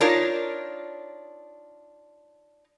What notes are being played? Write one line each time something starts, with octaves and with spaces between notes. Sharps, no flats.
D4 D#4 F4 A#4 C#5